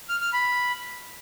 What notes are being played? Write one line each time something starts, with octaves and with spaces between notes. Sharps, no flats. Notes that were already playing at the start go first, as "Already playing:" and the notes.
F6
F6
B5